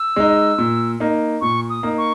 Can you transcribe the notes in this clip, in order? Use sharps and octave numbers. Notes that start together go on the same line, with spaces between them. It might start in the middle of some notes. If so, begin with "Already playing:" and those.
Already playing: E6
G#3 D#4
A#2
A#3 D#4
A#2 C#6
D#6
A#3 D#4
C#6